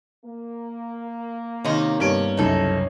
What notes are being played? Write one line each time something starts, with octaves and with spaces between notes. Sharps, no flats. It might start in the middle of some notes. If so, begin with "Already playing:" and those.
A#3
C3 D#3 C#4 D#4
G2 B3 C#4 D7
F#1 C2 F#2 D#4 A4